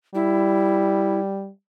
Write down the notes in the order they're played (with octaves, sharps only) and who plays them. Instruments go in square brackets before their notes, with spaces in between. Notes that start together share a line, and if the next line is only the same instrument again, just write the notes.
[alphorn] G3 [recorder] E4